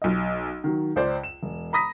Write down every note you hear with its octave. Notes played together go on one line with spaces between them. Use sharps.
B1 D#5
D#3 F#3
C#2 C5 D5
E7
E1
A#5 B5 D#6 A#6 B6